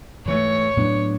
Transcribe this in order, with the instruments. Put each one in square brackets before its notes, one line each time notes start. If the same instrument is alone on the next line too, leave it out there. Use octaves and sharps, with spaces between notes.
[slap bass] G#2 E3 A3 [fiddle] C#5
[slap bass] A2 F#3 B3 D4